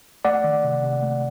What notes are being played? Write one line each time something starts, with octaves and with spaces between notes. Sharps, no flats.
A3 D5 F#5
D#3
C3
C3
A3